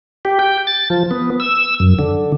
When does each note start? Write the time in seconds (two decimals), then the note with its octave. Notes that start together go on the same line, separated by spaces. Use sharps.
0.25 G4
0.39 G5
0.67 A6
0.90 F3
1.11 B3
1.40 E6
1.80 F#2
1.99 D3